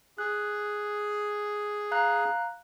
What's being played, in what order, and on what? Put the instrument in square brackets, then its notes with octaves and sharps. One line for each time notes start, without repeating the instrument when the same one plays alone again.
[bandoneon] G#4 [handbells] F#6
[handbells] F5 A#5 F#6